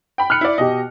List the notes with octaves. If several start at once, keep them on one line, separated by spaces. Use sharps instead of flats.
G5 B5
F6 F#6 C#7
E4 D5
B2 G4 D#5